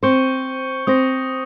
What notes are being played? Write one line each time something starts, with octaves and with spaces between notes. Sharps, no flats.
C4 C5 C#6 G6 C#7 G7
C4 C5 D#6 A#6 C#7